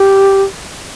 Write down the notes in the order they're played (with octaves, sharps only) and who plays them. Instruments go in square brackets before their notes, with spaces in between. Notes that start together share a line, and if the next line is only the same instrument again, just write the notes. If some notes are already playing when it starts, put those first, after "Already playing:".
Already playing: [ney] G4